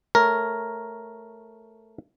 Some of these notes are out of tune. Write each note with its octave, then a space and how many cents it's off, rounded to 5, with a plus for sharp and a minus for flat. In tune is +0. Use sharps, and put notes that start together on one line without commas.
A3 +0 A#4 +0 C#5 +0